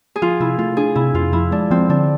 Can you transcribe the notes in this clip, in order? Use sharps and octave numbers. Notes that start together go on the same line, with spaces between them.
G#4
F3 F4
C3 E4
A3 F4
D4 G#4
C3 E4
F2 F4
F3 E4
G#3 D4
F3 C4
D3 D4